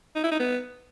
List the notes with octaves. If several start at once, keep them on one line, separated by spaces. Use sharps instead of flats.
D#4
E4
D#4
B3